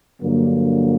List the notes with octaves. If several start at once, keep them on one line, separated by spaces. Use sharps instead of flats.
G2 D3 F#3 A#3